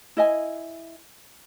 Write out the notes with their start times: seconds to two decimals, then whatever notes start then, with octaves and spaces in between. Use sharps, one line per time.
0.17 E4 D#5 G#5